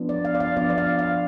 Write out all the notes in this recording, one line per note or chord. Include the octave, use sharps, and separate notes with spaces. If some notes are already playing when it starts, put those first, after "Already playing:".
Already playing: F3 B3 D4 F4
D5
F5
D5
F5
F3 B3 D4 F4 D5
D5
F5
F5